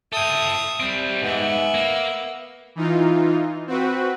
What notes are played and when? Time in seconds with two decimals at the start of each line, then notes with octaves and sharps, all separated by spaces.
0.13 A4 E5 G5 D#6
0.80 G3 C4
1.22 G#2 B3 E5
1.74 A#3
2.75 E3 D#4 F4
3.67 C4 F#4 B4